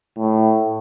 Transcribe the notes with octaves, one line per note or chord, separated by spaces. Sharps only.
A2